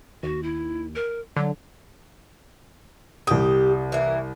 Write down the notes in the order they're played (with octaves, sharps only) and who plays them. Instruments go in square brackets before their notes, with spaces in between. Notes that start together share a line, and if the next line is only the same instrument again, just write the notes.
[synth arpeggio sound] D#2 [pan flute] F#4
[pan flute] E4
A#4
[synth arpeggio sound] D3 [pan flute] F#3
[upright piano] C2 D#6 [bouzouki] G4
[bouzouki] E3 A#3